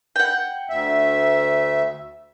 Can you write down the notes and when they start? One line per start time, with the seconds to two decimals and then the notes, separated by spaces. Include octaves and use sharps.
0.16 F#5 G5
0.70 D2 E5